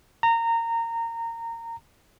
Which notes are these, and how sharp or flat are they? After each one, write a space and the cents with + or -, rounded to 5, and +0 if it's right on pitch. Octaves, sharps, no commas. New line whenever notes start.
A#5 -20